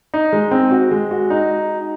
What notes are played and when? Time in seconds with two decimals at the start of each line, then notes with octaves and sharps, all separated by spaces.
0.14 D#4
0.33 G#3
0.51 C4
0.71 F#4
0.91 G#3
1.11 F#4
1.30 D#4